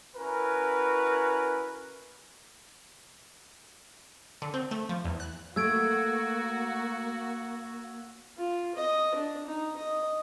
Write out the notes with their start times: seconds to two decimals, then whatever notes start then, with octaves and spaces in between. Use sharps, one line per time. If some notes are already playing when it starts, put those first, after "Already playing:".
0.17 C#4 E4 F#4 A#4 B4
4.42 D3
4.54 C4
4.71 A3
4.89 F3
5.04 E2
5.20 F#6
5.56 A3 A#3 F#4 E6 G#6 D7
8.37 F4
8.75 D#5
9.15 D4
9.45 D#4
9.76 D#5